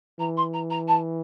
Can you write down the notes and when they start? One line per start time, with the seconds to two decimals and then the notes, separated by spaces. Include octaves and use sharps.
0.19 E3 A#5
0.37 C6
0.53 A#5
0.70 A#5
0.87 A5